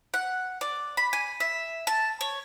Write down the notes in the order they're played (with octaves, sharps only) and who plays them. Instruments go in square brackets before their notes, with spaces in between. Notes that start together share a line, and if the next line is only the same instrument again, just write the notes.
[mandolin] F#5
D5
B5
G#5
E5
A5
C#5